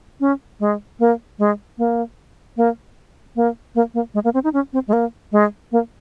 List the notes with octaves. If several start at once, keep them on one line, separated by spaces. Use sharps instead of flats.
C#4
G#3
A#3
G#3
A#3
A#3
A#3
A#3
A#3
G#3
A#3
C4
D#4
C#4
C4
G#3
A#3
G#3
A#3